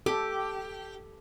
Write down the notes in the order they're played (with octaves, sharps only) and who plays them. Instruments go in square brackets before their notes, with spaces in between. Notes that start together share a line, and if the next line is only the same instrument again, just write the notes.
[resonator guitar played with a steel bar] G4 [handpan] A4